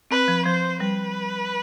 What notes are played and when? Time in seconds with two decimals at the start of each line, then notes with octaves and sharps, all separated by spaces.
0.11 C4 B4
0.28 F3
0.46 F3 C5
0.80 G3 B4